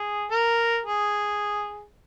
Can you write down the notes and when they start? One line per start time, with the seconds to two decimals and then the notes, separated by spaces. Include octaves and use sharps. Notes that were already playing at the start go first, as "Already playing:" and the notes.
Already playing: G#4
0.31 A#4
0.86 G#4